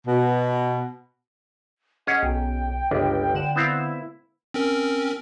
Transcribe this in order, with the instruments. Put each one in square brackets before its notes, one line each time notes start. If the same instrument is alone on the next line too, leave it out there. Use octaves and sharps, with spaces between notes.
[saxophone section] B2
[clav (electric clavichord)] C#4 G#4 C#5 [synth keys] D#5 [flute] F#5
[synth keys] B1 [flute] G5
[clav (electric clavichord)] G1 C#2 [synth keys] D4
[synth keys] D3 F#5 E7
[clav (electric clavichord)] B3 C4 F5 [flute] E4
[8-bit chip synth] C4 C#4 A#4